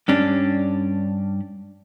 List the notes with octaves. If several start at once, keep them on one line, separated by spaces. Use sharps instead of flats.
G2 C#4 D4